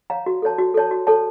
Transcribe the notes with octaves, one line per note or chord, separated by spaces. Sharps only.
C#5 F5 A#5
F#4
A4 C#5 A5
F#4
A4 C#5 A5
F#4
A4 C#5 A5